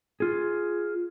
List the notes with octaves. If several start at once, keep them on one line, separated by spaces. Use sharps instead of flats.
F4 G#4